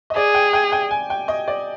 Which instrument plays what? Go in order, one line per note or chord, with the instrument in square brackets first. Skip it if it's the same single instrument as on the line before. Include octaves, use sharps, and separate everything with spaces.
[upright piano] D#5
[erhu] G#4 [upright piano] D5
[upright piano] G5
G5
G5
G#5
G5
D#5
D5